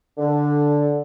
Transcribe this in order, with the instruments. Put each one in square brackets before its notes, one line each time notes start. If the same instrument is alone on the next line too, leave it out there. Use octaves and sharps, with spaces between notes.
[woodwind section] D3